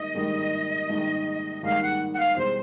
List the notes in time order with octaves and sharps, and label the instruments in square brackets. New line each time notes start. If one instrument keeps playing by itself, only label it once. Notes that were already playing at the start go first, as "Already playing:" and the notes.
Already playing: [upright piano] G#2 D#3 G3 A#3 [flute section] D#5
[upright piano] A#1 G#2 D#3 G3 A#3
A#1 G#2 D#3 G3 A#3
[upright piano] A#1 G#2 D#3 G3 A#3 [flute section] F5
[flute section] F#5
F#5
F5
[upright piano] E1 E2 B2 G3 [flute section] C5